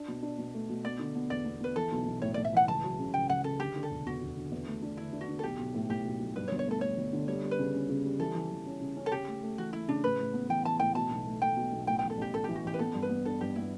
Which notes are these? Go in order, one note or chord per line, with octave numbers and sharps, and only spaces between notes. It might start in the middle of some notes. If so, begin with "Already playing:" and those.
Already playing: D4
B2
D4
B2
A3
B2
B3 D5
D3
B3
E2 D5
B3
B3 B4
E3 A4
B1
B1
A2 C#5
A2 D5
E5
E3 F#5
C#2 A5
F#3
C#3
C#2 G5
C#2 F#5
C#3 A4
D3 G4
D3
A4
E1
E2 F#4
E1
D3
E2
A3
D4
D3 E4
D4
F#4
D3
A4
B1 G4
B1
A2
A2 G4
B1
B1
G2 B4
C#5
G1
C#5
A3 A4
A3 C#5
G1
D3
G3 C#5
G3
B4
C#3
C#4
C#3
G3
E3 A4
E3
E3
C#4
C#3
C#4
A4
C#3 G4
A3
A3
E3 F#4
A3 E4
C#3 D4
A2 B4
A2
B3
E3 G5
E3 A5
A2 G5
B2 A5
B1
A3
A3 G5
B2
B1
A2 G5
A1 G5
A4
A1 G4
A1 A4
E3 G4
F#4
A1 G4
B4
B3 A4
G2
B4
B3
D4 A4
G2 G4
B3 E4